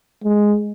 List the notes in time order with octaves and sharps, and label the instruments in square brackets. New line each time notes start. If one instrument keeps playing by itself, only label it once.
[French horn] G#3